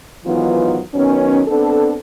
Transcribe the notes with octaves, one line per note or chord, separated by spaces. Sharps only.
G#2 D#3 E3 F#3 B3 F4
D#3 F#3 B3 C#4
B3 C4 D4 A4